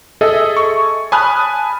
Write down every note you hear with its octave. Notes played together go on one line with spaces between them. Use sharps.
G#4 A4 D#5 E5
C#6
G#5 A5 B5 D#6 F6 F#6